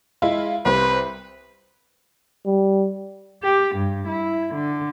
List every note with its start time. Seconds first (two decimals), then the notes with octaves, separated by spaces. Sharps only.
0.22 G#3 E4 F4
0.65 C2 C3 B4 C5
2.46 G3
3.43 G4
3.75 G2
4.08 E4
4.54 D3